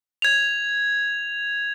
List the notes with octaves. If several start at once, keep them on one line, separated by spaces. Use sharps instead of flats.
G#6 F7